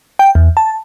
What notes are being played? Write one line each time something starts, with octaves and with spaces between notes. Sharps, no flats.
G5
E2
A5